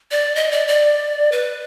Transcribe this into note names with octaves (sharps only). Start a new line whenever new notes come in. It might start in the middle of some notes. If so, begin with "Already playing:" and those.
D5
D#5
D5
D5
B4